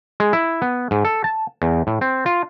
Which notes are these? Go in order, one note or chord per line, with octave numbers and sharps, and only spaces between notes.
G#3
E4
B3
G#2
A4
A5
E2
A2
C4
F4